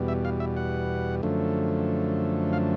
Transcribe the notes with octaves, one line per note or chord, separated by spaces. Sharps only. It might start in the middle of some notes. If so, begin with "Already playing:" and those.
Already playing: E2 B2 G3
E5
F5
E5
F#5
F#2 D3 F3 A3
F5